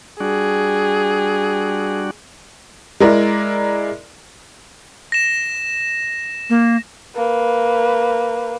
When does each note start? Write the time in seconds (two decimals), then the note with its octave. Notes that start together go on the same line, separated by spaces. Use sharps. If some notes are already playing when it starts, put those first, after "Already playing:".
0.20 G3 D4 F#4 G#4
3.00 G#3 E4 A#4 D5
5.12 A#6 E7
6.50 A#3
7.16 A#3 B4